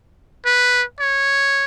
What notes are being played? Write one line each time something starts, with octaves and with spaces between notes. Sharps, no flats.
B4
C#5